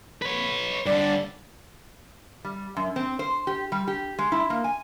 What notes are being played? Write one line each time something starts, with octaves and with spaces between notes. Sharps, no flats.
B4 C#5
G2 D3 D5
G3
F#2
C4
C5
G4
G3
G4
G#3
E4
A#3
G#5